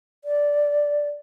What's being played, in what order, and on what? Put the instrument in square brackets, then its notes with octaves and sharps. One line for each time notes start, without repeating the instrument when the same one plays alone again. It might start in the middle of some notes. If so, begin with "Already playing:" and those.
[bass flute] D5